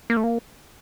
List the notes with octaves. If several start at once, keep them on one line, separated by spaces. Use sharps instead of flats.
A#3
A3
A#3